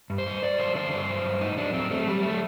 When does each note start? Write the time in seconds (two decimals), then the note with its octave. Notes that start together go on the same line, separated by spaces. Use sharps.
0.10 G2
0.18 C5
0.26 G2
0.42 G2 D5
0.58 F#3 C5
0.75 D3 C5
0.91 G2 C5
1.09 F#3
1.25 G2
1.41 A2 D#4
1.57 F#3 D4
1.73 F#3 C4
1.90 F#3 A3
2.07 F#3 G3
2.23 F#3 A3